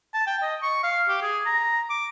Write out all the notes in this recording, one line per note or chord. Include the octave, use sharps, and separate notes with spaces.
A5
G5
D#5
C#6
F5
G4
G#4
A#5
D6